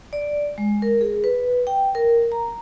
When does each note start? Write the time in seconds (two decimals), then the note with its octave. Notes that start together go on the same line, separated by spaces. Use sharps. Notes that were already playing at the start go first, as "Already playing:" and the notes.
0.13 D5
0.58 G#3
0.82 A#4
1.01 G#4
1.24 B4
1.67 G5
1.95 A#4
2.32 A#5